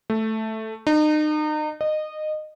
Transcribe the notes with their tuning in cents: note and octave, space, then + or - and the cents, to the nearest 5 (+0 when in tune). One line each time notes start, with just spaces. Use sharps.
A3 +0
D#4 -35
D#5 -20